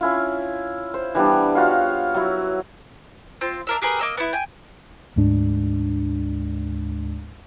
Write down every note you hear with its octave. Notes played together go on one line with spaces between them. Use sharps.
C#4 E4 F4
C5
E3 G3 B3 D4
F4 F#4 C#5 F5
F#3 E4
C4 F4
D4 A#4 E5
G4 G#4 A#4 B4
A#3 D#5 E6
B3 E4
G5 G#5
D2 G#2 G#3 D4